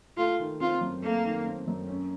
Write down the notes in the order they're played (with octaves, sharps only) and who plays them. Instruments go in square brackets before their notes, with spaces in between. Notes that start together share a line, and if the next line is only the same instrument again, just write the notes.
[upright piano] A3 [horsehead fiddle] F4
[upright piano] D#3
[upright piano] C4 [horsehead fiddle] F4
[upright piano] F#2
[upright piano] A3 [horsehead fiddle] A#3
[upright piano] D#3
C4
F#2
C#4